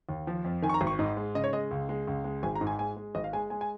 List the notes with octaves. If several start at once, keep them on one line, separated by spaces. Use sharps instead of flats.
D#2
F3
F2
D#3 G#5
C#6
A#5
G#1
C#6
G#2 D#5
G#3
C#3 D#5
C#5
G#3 D#5
C#2
G#3
C#2
G#3
G#1 G#5
A#5
G#2
G#5
G#3 G#5
G#3
G#1 D#5
F5
G#3 G#5
G#3 G#5
G#5